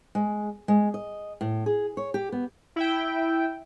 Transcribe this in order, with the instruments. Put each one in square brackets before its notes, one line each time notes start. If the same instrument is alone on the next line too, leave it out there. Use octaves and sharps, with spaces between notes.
[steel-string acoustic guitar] G#3
G#3
D#5
A2
G#4
C#5
G4
B3
[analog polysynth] E4 E5 G5